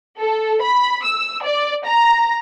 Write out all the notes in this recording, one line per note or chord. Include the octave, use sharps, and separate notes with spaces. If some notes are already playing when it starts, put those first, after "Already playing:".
A4
B5
E6
D5
A#5